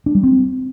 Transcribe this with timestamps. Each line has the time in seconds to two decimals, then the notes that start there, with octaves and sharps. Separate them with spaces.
0.06 D4
0.15 G3
0.23 C4